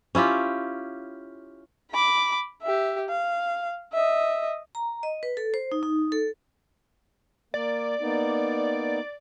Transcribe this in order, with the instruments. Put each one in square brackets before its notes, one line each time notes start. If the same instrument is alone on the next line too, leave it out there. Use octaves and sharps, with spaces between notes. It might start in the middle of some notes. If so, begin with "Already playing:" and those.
[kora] C#4 E4 F4 G4
[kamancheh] B5 D6
G4 E5
F5
D#5 E5
[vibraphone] A#5
D#5
B4
A4
C5
D#4
D#4
A4
[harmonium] A#3 [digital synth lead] D5
[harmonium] A#3 B3 D#4